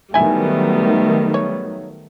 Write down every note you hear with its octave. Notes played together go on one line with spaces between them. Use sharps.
D#3 F#3 G3 A3 B3 E4 G#5
C#5